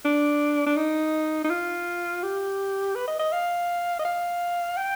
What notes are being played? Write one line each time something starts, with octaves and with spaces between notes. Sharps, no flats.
D4
D4
D#4
D#4
F4
G4
B4
D#5
D#5
F5
D#5
F5
G5